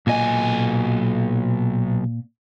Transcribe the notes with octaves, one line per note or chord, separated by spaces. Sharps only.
B1 A#2 D#5 G#5